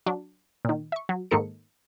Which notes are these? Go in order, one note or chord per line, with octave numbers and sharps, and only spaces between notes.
F#3 D4
A#2 D#3
E5 C#6
F#3
G#2 D#3 A#3 D#4 A4 C#7